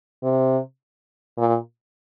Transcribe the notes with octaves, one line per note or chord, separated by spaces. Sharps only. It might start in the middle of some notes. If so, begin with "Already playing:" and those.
C3
A#2